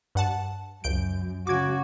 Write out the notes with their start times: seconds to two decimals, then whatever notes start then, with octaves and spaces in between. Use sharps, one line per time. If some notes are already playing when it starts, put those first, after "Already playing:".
0.15 G2 F#5 A5
0.84 C#2 F#2 G6 D7
1.47 C#3 F#4 D6 G#6